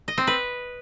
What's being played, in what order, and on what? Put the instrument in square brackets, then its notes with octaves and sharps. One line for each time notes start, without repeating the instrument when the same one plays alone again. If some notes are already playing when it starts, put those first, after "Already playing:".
[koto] D#5
C4
B4